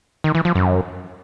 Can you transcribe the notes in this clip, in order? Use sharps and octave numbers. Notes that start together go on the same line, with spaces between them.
D#3
E3
F3
F#2